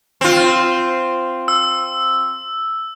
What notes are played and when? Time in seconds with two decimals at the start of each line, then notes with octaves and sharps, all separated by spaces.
0.21 C4 F4
1.48 E6